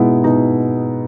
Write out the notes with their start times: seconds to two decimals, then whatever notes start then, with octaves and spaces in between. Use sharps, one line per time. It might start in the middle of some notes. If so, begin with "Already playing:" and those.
Already playing: B2 G#3 B3 D#4 E4
0.24 B2 D#4